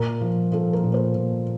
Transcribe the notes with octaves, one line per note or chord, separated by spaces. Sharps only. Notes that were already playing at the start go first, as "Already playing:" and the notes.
Already playing: A#2 A#4
F3
F3 A4
A#4
A#2
C5
A#2